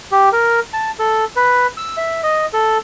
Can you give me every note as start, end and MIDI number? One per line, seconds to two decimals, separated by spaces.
0.12 0.29 67
0.32 0.60 70
0.73 0.91 81
0.99 1.25 69
1.36 1.67 71
1.77 1.96 88
1.97 2.21 76
2.23 2.46 75
2.53 2.78 69